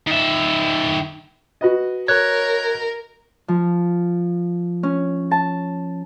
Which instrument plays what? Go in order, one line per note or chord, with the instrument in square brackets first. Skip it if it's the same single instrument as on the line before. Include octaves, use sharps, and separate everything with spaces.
[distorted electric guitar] D#3 E5
[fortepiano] F#4 B4 D#5
[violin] A#4 [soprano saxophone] C#5 [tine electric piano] F#6 G#6
[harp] F3
C#4
A5